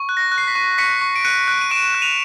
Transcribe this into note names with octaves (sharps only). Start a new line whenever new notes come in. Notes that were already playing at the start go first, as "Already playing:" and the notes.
Already playing: C#6
F#6
A#6
F#6
C7
B6
C#6
C#6 B6 C#7
C#6
D7
F#6 C#7 D#7
F#6 D7
D#7
C#6 D7 E7
F#6
D#7 F7